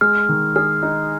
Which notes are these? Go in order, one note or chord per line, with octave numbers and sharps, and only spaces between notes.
G#3 F6
D#3
G#4 F6
D#4